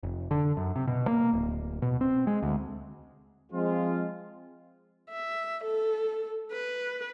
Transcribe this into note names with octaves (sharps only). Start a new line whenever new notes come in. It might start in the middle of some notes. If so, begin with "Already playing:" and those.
F1
D3
F#2
C3
B2
A#3
D1
B2
C4
G#3
D2
F3 G#3 C4 F4
E5
A4
B4